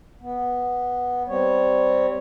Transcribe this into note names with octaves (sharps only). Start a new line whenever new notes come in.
B3
G3 C4 C#5